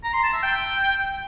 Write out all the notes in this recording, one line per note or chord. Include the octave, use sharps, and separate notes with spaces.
A#5
C6
A5
E5
G5